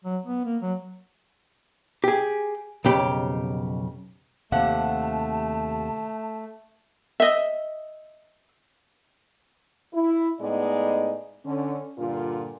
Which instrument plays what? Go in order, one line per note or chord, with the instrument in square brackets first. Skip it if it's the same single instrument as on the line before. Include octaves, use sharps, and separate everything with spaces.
[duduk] F#3
B3
A#3
F#3
[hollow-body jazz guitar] G4 G#4
B1 F2 C#3 G4 B5
[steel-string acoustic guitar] D#2 C3 F#5 [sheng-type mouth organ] A3 [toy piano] F5 [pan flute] A5
[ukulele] D#5 E5
[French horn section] E4
A2 G#3 B3 D#4 D5
D3 C#4
G2 A#2 D3 F4